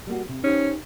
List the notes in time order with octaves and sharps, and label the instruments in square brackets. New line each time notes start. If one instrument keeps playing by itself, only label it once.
[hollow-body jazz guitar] G3 A#3 F#4
C3
[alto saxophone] C#4 [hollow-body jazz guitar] D#4 G4 C5